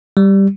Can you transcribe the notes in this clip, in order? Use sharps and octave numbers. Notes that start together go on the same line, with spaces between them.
G3